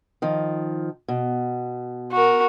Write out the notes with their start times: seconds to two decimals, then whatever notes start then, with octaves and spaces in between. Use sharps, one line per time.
0.22 D#3 F3
1.08 B2
2.12 F#4 A#4